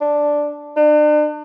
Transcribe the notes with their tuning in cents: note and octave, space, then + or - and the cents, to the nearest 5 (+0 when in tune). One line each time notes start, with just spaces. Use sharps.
D4 +0
D4 +40